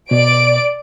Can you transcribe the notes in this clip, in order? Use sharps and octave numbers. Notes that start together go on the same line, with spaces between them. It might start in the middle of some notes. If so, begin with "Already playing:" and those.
B2 D5 D7